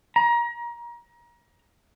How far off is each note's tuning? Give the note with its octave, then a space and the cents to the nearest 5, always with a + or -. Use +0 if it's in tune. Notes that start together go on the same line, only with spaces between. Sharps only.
A#5 +30